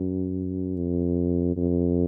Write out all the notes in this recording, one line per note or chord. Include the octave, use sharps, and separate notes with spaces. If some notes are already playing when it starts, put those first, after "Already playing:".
Already playing: F#2
F2
F2